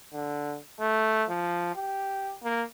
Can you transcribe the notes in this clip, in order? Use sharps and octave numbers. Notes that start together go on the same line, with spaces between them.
D3
A3
F3
G4
A#3